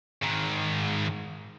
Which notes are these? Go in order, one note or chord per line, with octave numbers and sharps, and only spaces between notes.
G#2 D#3